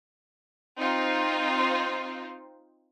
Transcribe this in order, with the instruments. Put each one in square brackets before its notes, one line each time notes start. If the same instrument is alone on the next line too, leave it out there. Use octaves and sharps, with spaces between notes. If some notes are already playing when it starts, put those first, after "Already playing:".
[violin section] C4 D#4 F4 C5